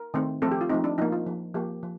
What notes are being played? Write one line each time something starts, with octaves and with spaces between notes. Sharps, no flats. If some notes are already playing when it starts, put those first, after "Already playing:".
Already playing: A#4
D#3 A3 C4
F3 A3 C4 A4
G4
F4
F3 A3 C4 D#4
D4
F3 A#3 D#4
F4
F3 A#3
F3 A#3 G4
F3